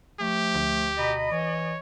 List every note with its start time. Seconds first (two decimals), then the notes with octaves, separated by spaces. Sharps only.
0.20 F3 A3 G4
0.54 D2
0.98 B2 D#5 A#5 B5
1.31 E3 C#5